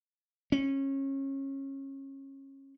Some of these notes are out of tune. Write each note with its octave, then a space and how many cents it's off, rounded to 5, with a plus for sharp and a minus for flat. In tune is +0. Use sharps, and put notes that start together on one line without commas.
C#4 -25